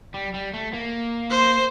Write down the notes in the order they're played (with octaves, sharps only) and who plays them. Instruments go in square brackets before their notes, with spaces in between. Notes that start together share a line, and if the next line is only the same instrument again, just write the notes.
[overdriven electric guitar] G3
G3
A3
A#3
[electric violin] C5